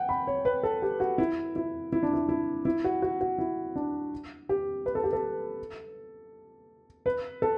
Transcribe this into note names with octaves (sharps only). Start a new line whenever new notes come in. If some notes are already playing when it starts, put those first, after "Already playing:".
Already playing: F#5 G5
B5
C#5
B4
A4
G4
F#4
E4
E4
E4
D4
E4
E4
E4
F#4
F#4
F#4
E4
D4
G4
B4
A4
G4
A4
B4
A4